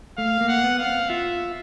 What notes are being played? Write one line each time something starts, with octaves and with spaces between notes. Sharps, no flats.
A3 F5
A#3
F#5
B3
F5
C4
F4 E5